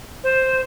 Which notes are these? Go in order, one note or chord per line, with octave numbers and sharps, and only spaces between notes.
C5